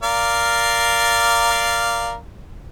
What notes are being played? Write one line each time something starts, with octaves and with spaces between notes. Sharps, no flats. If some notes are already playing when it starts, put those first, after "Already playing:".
A#4 D5 F5